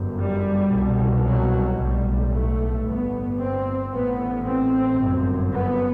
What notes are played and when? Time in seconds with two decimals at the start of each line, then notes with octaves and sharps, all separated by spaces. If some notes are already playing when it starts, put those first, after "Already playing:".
Already playing: G1 F#2
0.21 G3
0.74 C2 B2
1.27 F#3
1.80 B1 A2 G3
2.34 A3
2.86 G1 G2 B3
3.40 C4
3.92 A1 A2 B3
4.46 C4
4.99 G1 F#2
5.52 B3